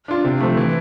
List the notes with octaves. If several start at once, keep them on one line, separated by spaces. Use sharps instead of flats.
D4 F4
C3
F3 A3
E3